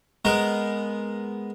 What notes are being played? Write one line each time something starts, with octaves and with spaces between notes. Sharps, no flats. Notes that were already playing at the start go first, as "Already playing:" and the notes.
G#3 B3 A#4